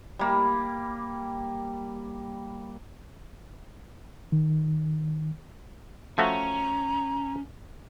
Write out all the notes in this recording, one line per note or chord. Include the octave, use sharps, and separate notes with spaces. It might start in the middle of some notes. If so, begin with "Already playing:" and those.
G3 A#3
D#3
F3 A3 C#4 F#4 A#5